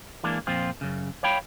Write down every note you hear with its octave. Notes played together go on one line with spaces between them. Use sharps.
E3 G#3 A#3 D4
F2 A#2 F3 C4 F4
F#2 C#3
C#5 F5 G5 B5